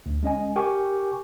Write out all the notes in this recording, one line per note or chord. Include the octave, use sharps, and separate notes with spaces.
D2
G#3 C#4 D#5 G#5
G4 A#4 G5 G#5 C#6 D6